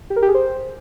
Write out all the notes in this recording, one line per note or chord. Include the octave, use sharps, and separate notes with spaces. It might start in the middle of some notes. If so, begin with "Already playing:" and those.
G4
A#4
G4
G#4
C5